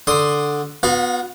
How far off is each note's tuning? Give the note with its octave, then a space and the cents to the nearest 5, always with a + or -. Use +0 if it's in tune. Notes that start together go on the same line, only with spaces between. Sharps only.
D3 +0 C6 +0 D#6 +0
B3 +0 F#4 -40 F5 +35